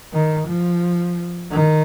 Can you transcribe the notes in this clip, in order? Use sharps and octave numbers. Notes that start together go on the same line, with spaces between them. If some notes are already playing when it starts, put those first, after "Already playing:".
D#3
F3
D#3